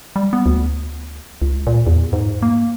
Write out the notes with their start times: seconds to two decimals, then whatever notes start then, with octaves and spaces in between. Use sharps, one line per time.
0.16 G3
0.33 B3
0.46 D2
1.42 C#2
1.67 A#2
1.87 E2
2.13 G#2
2.42 A#3